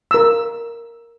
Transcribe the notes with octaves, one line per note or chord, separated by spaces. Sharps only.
A#4 E6